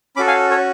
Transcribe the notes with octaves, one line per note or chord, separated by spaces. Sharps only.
C#4 F#4 A4 B5 D6
F5 G#5
A4 C#5